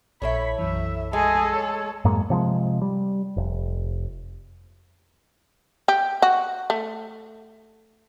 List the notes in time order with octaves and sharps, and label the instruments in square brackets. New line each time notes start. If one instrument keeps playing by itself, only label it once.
[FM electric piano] A#1 A#2 B6 [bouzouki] E4 A4 C#5 [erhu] B5
[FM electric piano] B1 F#2 E3 [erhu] E5
[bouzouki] G#3 [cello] G#4 D#5 [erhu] A4
[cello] C#5 [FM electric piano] E6
[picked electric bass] F#2 A2 G#3 A#3
C3 F3 G#3
G3
F1
[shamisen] G4
F#4
A3